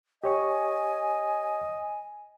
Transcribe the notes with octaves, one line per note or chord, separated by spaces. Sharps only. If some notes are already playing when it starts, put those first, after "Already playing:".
G4 C#5 D#5 G#5 C#6